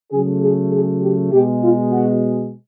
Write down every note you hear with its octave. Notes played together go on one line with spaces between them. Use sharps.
C#3 F#3 A3 G#4
G#4
G#4
G4
B2 G#3 G4
F4
F#4